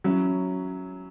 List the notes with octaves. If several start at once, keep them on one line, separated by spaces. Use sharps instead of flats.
F#3 C#4 E4